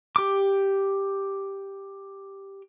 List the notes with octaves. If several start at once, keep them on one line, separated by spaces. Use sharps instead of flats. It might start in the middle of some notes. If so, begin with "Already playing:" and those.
G4 D6